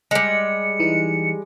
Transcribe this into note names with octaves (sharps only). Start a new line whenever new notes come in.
G3 G#3 C#7
E3 D#4